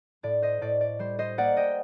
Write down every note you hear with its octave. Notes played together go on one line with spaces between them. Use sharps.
A2 D5
C5 D#5
A2 D5
D5
G3 C5
C5 D#5
A#3 D5 F#5
D#5 G5